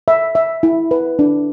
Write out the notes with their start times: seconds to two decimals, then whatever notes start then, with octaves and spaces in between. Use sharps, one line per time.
0.08 E5
0.35 E5
0.63 E4
0.91 B4
1.19 D4